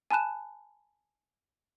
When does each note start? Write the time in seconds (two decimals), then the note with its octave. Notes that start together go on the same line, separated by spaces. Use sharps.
0.11 G#5 A5 B5 F#6 E7